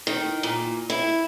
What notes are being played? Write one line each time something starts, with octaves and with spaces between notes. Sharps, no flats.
D#3
A#2
E4